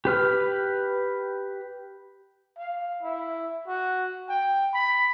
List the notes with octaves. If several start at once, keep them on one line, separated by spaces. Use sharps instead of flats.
G4 B4 F6
F5
E4
F#4
G5
B5